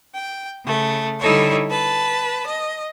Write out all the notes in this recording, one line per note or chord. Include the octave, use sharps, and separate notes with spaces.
G5
C#3 A3
D3 G3 D#4 E4 A4 C#5
B4 A5
D#5